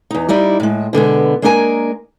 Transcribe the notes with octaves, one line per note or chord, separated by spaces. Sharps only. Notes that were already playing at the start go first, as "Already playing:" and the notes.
E2 D#4
G3 D#4 E4 D5
A2 G#3
B2 D3 G#3 B3
G#3 A#3 D4 E4 A#4 G#5